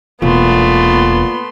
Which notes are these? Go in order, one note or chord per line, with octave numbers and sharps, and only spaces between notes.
E1 A#2 A3 B3 D4 C6